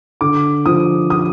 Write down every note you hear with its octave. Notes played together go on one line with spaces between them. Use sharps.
D3 D6
F3 D#6
D#6